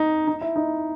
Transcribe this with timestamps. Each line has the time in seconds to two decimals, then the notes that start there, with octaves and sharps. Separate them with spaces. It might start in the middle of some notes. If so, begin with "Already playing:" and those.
Already playing: D#4
0.27 D#4
0.41 E4
0.56 D#4